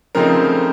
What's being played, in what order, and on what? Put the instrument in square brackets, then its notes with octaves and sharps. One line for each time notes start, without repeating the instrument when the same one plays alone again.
[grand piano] C#3 F3 A3 C4 D#4 A#4